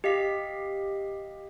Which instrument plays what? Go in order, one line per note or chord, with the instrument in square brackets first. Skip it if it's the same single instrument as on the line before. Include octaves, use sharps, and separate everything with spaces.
[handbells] G4 D#5 F5 B6